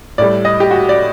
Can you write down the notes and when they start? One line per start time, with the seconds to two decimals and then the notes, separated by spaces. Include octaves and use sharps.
0.18 A2 G3 D5
0.45 D#5
0.60 G4
0.71 F#4
0.89 D5